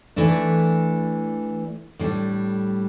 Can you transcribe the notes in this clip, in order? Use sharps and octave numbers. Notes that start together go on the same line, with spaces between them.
E3 A3 D4
A2 G3 D4